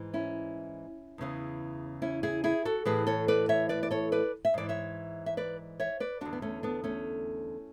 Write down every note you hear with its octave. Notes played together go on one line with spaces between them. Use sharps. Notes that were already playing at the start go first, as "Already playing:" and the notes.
Already playing: G#2 E3
C#4 E4
E2 C#3 E3
C#4 E4
E4 G#4
E4 G#4
F#4 A4
A2 E3 G#4 B4
A4 C#5
B4 D5
C#5 E5
B4 D5
D5
A4 C#5
B4 D5
E5
G#2 E3 D5
C#5 E5
E5
B4 D5
C#5 E5
B4 D5
E2 D3 D4 F#4
B3
A3 C#4
B3 D4
A3 C#4